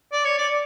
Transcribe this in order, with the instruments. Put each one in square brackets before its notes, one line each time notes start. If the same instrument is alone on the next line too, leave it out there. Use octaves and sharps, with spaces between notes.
[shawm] D5
C#5
D5